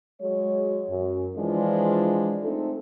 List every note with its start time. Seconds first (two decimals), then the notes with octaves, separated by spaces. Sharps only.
0.21 F#3 G#3 C#5
0.89 F#2
1.37 E3 F3 G#3 D4 F4
2.44 A3 C4 D#4 A4